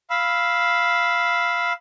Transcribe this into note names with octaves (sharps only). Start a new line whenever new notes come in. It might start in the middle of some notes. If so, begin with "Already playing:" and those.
F5 B5 E6